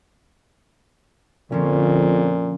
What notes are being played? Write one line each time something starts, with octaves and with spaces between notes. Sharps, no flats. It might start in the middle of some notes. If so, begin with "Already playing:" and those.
F2 A#2 D3 F3 C#4